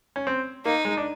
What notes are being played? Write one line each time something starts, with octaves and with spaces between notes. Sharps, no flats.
C#4
C4
A#3 D#4
G#3
D4